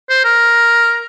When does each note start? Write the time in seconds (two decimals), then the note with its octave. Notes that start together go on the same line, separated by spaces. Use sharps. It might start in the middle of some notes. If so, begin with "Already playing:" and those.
0.10 C5
0.25 A#4